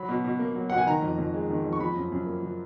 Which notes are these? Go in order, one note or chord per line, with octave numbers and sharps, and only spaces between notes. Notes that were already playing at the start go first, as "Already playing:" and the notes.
Already playing: F#3 B5
B2
B2
A#3
F#3
B2 F#5
G#5
D#3 A#5
F2
F2
G#3
D#3
F2
C#6
F3 B5
F#2
F#2
A#3
F3